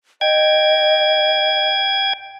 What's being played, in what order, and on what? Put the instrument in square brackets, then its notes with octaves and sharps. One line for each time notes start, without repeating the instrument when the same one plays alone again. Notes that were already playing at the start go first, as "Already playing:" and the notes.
[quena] D#5 [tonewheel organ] G5 G#6